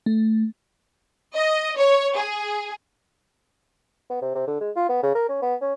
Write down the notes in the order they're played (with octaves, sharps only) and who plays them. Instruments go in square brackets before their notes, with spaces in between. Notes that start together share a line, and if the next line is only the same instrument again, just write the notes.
[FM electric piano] A3
[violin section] D#5
C#5
G#4
[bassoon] B3
C3
C3
D3
G#3
F4
B3
C#3
A#4
C#4
B3
C#4